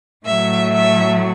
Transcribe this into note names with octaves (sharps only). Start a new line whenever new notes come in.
A2 F#3 A3 E5
E5